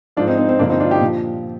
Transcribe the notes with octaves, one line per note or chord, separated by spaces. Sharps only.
G#2 F3 D4 F4
C4 D#4
C4 D#4
C4
G2 D3 F3 A#3 D4
C4 D#4
D4 F4
D#4 G4
A#2 F3